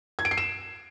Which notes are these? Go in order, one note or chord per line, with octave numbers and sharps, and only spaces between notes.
G#6
D7
C7
E7